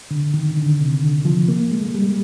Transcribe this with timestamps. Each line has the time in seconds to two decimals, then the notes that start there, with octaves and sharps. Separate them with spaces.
0.11 D3
0.34 D#3
0.57 D3
0.80 C3
1.02 D3
1.25 F3
1.49 A#3
1.72 G#3
1.94 G3